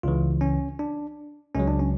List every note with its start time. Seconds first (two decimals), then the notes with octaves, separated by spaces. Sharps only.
0.03 C#2 C#3 E3 F4
0.41 C#4
0.79 D4
1.55 C#2 C#3 F#3 C#4
1.67 D4
1.80 C#4